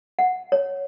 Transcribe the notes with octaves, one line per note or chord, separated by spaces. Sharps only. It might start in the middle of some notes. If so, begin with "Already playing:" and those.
F#5
C#5